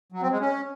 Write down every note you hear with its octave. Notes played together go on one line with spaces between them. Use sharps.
F#3
C4
G#3
C#4